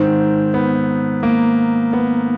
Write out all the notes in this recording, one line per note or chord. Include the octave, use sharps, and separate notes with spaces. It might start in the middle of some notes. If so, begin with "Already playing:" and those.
Already playing: G#2 D#3 C4
B3
A#3
B3